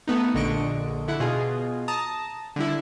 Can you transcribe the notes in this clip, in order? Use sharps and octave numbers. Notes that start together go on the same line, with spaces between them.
A3 B3 D#4
A#1 D3 D#5 C#6 D7
D3 E4 F#5
B2 F4 G#4
A5 A#5 D#6
D3 G3 E4